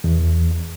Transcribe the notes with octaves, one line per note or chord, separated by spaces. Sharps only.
E2